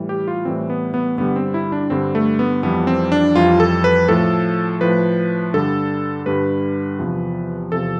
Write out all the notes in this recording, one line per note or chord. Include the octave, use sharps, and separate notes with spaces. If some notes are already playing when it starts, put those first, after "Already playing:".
Already playing: A2 E3 G3
G4
F4
A2 E3 G3 C4
B3
B3
G2 D3 G3 B3
C4
E4
D4
G2 D3 G3 C4
A3
B3
F2 E3 G3 B3
C4
D4
F2 E3 G3 F4
A4
B4
A2 F3 A4
A2 F3 B4
G2 D3 G3 A4
G2 D3 G3 B4
E2 C3 F3
E2 C3 F3 A4